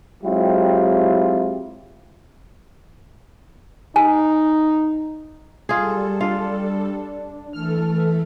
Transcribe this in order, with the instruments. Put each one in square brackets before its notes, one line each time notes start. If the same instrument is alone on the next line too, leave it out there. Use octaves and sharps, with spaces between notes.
[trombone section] F#3 G#3 C4 E4 F4 G4
[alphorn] D#4 [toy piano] G#5
[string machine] G3 A4 [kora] F4 G#4
[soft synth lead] D4 [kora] F4
[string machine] E3 A3 A4 [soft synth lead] F6